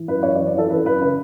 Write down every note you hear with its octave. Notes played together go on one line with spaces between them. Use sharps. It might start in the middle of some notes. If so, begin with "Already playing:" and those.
Already playing: E3
F#2 B4
F#2 C#5
E3 C#5
D5
E3 A4
E3 B4
F#2 B4
C#3 B4